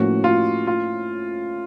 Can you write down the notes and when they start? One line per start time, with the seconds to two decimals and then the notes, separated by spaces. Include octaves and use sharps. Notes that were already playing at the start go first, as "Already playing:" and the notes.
Already playing: A2 F3 A#3 C#4 F#4
0.24 F4
0.67 F4